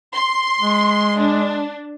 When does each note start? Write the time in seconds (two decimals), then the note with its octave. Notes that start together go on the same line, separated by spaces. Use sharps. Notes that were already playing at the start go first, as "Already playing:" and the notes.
0.14 C6
0.60 G#3
1.18 D4